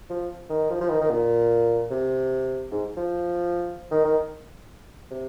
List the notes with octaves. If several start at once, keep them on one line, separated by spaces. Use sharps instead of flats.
F3
D#3
F3
F3
D#3
D#3
A#2
C3
G#2
F3
D#3
D#3
C3